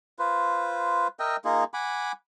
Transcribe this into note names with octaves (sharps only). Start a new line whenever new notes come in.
F4 B4 C5
A#4 D#5 E5 G5
A#3 D#4 F4 G#4
F#5 G#5 B5 D6